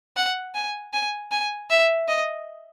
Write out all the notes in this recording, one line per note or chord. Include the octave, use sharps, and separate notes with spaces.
F#5
G#5
G#5
G#5
E5
D#5